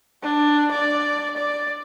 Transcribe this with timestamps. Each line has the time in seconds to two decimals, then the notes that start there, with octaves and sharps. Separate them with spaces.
0.23 D4
0.72 D5
1.37 D5